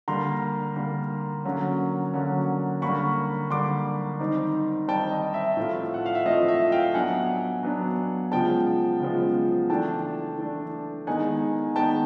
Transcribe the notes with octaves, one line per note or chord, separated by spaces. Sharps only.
D3 G3 A#3 A#5 C6
D3 G3 A#3
D3 F#3 A#3 C#4
D3 F#3 A#3 C#4
D3 G3 A#3 B5 C#6
D3 G3 A#3 C6 D6
D#3 G3 C4 D#4
D#3 G3 C4 D#4 G5 A5
D#5
E5
A2 F3 A3 C4 F4
F#5
F5
E5
A2 F3 A3 C4 F4 D#5
E5
F5 G5
F#3 B3 D4 F#5 G#5
F#3 B3 D4
C#3 F3 G#3 B3 G5 A5
C#3 F3 G#3 B3
E3 A3 D4 G5 A5
E3 A3 D4
D#3 G#3 B3 D#4 F#5 G#5
D#3 G#3 B3 D#4 G5 A5